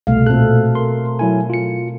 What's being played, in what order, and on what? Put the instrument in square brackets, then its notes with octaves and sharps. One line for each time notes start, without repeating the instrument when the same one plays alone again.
[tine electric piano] C2 [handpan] B2 A3 F5
[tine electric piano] A#2 F#6 [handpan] C4 A4
[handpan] A#4 [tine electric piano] C6
[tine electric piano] F#3 E4 G#5
F4 C#7